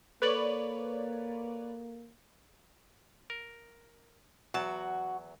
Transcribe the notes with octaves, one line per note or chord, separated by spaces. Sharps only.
A#3 A4 B4 C#5 D5 F#7
A#4
E2 F#3 F#4 A5